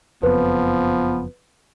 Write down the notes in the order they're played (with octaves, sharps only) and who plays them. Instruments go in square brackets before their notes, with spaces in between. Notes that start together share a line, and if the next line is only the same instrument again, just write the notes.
[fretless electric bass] F#1 F2 [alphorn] F3 [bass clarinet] B3 [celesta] B4